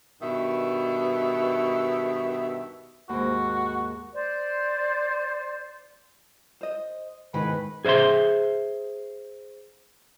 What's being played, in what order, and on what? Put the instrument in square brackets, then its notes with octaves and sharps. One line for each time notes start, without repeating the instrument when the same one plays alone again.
[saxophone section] G2 B2 D#3 E5
[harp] D#2 G#2 [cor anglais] F#4
[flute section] C5 D5
[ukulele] C5 D#5
[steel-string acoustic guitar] E2 D#3 [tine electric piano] G#2 [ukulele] G#4 [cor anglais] B4
[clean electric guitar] G#4 C5 D5 E5 C6